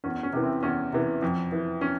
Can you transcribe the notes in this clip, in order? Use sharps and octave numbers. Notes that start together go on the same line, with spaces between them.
E2 C#4
C#4
C3 E3
C4
E2 C#4
C3 E3
F2
E3
C#4